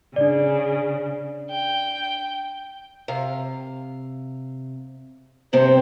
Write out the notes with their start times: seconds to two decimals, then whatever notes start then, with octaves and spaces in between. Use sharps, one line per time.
0.16 C#3 D4 D5
1.50 G5
3.08 C3 F5
5.53 G2 C3 C4 C5